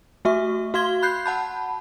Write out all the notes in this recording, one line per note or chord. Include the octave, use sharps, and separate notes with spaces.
A3 F#4 E5 C#6
F#4 F5 C6 G#6 G7
B5 F#6 G6 C7
F#5 A5 B5